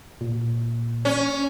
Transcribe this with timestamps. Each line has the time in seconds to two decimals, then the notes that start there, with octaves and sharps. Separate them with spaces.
0.21 A#2
1.05 C#4